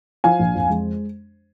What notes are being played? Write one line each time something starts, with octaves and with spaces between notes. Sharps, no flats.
F3 F5 G#5
A#1
F2
G#3